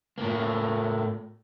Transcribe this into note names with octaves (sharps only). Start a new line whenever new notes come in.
A2 A#3